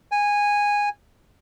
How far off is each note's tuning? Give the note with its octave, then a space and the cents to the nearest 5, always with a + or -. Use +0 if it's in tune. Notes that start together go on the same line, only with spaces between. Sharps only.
G#5 -15